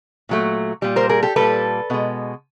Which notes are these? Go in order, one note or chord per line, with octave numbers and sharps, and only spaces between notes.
A#2 F#3 A3
A#2 G3
A#4 C5
G#4 A#4
G4 A4
A#2 G3 A4 B4
B2 G#3